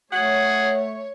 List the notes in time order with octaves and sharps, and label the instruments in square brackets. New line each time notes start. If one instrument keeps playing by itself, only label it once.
[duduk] A3 [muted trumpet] G#4 [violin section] C#5 [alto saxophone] F#5